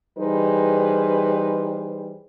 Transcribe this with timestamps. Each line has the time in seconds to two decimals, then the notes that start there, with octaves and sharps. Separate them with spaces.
0.18 E3 G3 D#4 G#4 B4 C5